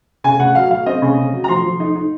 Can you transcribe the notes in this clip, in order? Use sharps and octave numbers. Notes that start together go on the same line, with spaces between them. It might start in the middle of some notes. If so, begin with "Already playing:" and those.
C#3 G#5
C#3 F#5
F#3 F5
F#3 F5
C4 D#5
C#3
C#3
F#3
A#5
F3 C6
F3
D#4
D#4